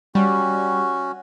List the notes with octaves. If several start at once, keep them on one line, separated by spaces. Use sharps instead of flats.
G3 C#4 F#4